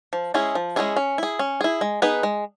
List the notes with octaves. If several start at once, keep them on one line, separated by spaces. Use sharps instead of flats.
F3
G#3 C#4 E4 G#4
F3
G#3 C#4 E4 G#4
C#4
E4 G#4
C#4
E4 G#4
G#3
B3 D#4 G#4 B4
G#3